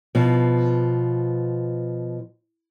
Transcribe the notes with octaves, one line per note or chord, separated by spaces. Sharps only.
B2 F3